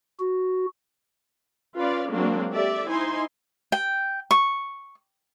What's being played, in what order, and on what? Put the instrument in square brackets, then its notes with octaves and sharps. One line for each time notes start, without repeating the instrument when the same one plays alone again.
[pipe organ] F#4
[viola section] C#4 F4 B4 D5 F5
F#3 G#3 A#3 C4 D4
G4 A4 D5 E5
D#4 E4 C5 G#5 C6
[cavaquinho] G5
C#6